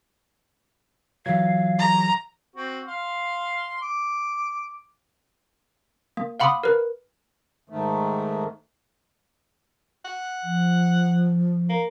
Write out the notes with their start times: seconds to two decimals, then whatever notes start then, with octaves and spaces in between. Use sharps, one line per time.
1.26 E3 F#3 F5 G#6
1.79 A#5
2.56 C4 F#4
2.88 F5 C6
3.82 D6
6.17 A#3
6.40 F5 F#5 B5 C6 D6 D#6
6.64 A#4 B4
7.69 G#2 D#3 A3
10.05 F#5
10.43 F3
11.69 A#3